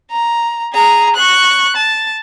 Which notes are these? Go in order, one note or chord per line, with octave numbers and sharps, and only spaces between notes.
A#5
G#4 A#5
C#6 F#6
A5